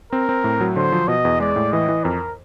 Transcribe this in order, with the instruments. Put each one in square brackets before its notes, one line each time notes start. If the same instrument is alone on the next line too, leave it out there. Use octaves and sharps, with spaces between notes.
[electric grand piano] C4 [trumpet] A#4
[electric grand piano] C4
A2
F#3
[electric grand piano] D3 [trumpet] C5
[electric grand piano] F3
[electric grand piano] B2 [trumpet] D#5
[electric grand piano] E2
[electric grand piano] G#3 [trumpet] D5
[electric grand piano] A2
[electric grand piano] E3 [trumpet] D#5
[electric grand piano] E3
[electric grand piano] F2 [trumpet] A#4